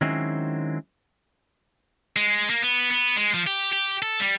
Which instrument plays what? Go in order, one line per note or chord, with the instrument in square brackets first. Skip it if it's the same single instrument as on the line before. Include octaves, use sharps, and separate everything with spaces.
[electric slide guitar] D#3 F#3 G#3 C4 C#4 E4
[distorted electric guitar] G#3
A#3
B3
B3
G#3
F3
G4
G4
A4
G3